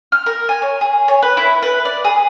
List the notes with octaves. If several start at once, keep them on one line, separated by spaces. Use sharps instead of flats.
F6
A#4
G#5
C#5
G#4
C#5
B4
E4
B4
D5
G#4